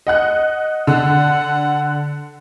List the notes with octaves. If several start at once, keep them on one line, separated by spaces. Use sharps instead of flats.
D#5 F#5 F#6
D3 F#5